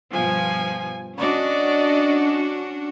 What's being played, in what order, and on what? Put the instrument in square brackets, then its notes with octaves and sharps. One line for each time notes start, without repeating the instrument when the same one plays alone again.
[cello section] G2 B2 F3 [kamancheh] G#5
[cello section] C#4 D4 F#4 [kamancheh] D5 D#5